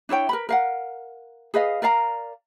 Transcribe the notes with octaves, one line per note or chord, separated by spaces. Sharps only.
D4 E4 C#5 G5
A#4 B4 B5
A#4 F5 F#5
G#4 B4 D#5 F5
A#4 D5 F5 A#5